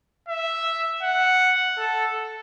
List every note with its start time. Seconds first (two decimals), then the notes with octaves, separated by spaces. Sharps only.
0.29 E5
1.03 F#5
1.78 A4